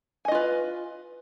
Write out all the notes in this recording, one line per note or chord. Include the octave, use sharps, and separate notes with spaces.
F4 B4 D#5 G#5